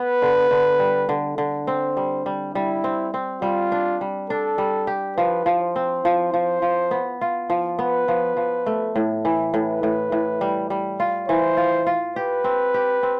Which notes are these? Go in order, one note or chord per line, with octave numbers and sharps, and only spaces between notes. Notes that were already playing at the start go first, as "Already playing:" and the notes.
Already playing: B3 B4
D3
D3
G3
D3
D3
C4 C5
G3
G3
G3 E4
C4
C4
G3 F4
D4
G3
D4 A4
G3
G4
F3 B4
F3
C5
C4
F3
F3
F3
B3
F4
F3
B3 B4
F3
F3
A3
A2
E3
A2 B4
A2
A2
G3
G3
F4
E3 C5
F4
F4
G4 B4
C4
G4
C4